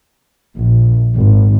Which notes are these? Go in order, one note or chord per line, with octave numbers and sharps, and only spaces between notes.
A#1
G#1